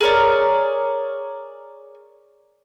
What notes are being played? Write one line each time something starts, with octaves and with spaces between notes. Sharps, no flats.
G#4 A#4 C#5 D5